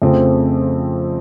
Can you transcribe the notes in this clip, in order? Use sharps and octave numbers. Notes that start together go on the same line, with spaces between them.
F2 C#3 F3 A3 C4